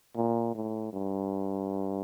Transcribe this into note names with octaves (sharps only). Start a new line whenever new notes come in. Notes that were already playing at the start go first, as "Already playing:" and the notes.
A#2
A2
G2